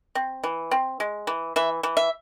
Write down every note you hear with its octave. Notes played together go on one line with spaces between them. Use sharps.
C4
E3
C4
G#3
E3
E3 E5
E3
E5